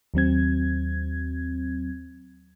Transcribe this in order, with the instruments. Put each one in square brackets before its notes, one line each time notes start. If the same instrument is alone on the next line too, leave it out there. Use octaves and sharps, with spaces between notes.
[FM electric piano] D#2 F#3 C4 G#6